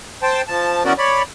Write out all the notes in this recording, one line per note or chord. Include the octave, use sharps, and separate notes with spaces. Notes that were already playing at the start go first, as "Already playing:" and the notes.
C5 G5 A5
F3 A5
E3 B3 C#4 F#4 A#4 D5
C#5 D5 B5